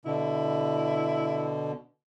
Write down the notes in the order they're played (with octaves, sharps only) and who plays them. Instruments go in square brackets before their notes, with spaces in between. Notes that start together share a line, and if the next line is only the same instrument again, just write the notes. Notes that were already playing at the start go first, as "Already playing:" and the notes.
[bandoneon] B2 D3 [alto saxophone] E4